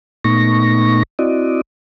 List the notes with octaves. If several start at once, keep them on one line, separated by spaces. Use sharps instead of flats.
A#2 A3 B3 D#4 C#6 A#6
C4 E4 F#4 D5 D#5